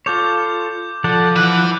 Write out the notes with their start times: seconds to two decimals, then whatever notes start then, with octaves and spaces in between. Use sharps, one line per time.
0.06 F4 A4 C#5 D6 G6
1.04 F3 A4 D5 F#5 G6
1.36 E3 B4 F#5 F#6